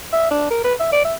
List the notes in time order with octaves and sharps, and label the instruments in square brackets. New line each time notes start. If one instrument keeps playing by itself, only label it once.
[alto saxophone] E5
D4
A#4
B4
E5
D5
E5